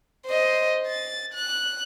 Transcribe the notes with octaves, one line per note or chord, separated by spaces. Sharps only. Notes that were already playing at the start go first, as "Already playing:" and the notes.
C5 D#5
A6
F#6